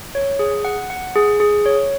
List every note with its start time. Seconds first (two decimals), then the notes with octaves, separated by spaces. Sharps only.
0.15 C#5
0.39 G#4
0.65 F#5
0.90 F#5
1.16 G#4
1.40 G#4
1.66 C#5